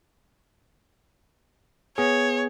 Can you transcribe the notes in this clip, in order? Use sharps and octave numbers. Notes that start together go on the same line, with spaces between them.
B3 G#4 C#5